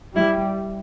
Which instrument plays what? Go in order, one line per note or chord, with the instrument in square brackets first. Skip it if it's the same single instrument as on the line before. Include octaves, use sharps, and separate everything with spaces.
[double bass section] G3 [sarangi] E4